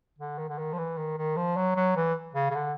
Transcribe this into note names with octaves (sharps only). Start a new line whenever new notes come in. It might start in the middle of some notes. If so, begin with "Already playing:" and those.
D3
D#3
D3
D#3
F3
E3
D#3
D#3
F3
F#3
F#3
E3
C#3
C#3
D3